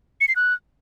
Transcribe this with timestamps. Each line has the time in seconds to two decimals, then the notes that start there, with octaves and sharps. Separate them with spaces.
0.21 C#7
0.28 C7
0.36 F#6